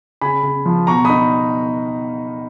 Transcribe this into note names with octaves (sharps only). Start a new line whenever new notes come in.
C#3 G#5 B5
C#3
F3
B2 A#5 C#6
D#4 B5 D#6